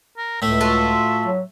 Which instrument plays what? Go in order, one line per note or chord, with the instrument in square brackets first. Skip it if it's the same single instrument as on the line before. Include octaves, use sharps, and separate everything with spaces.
[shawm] A#4
[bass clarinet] C#2 [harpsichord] A2 A3 [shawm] E5
[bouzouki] F4 F#4 A4
[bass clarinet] F#3